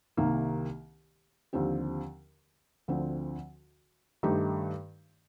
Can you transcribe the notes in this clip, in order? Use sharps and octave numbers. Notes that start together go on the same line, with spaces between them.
C2 C3 D#3 A#3
D#2 D3 F3 C4 G4
D2 D3 F3 C4
G2 D#3 A3 D#4 G4